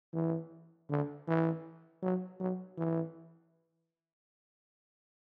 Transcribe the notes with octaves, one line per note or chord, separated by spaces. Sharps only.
E3
D3
E3
F#3
F#3
E3